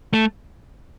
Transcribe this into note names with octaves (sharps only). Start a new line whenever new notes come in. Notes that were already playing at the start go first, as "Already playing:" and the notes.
A3